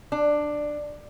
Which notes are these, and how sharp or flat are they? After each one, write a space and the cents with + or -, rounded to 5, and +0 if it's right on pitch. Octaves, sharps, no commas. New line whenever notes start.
D4 +10